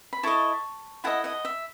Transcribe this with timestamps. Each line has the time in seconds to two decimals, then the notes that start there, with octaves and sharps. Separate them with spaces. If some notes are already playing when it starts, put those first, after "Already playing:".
0.13 B5
0.23 E4 A4 D#5 A5 C#6
1.04 E4 A4 D#5 F#5 A5
1.24 D#5 F#5
1.45 E5